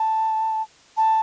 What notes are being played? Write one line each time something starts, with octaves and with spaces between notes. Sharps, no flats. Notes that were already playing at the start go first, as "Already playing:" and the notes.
Already playing: A5
A5